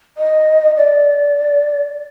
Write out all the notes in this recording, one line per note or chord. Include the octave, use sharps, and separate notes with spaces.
D#5
D5